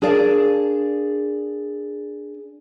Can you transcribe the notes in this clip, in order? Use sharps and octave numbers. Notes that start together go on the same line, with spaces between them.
D4 G#4 A#4 D5 F5 A5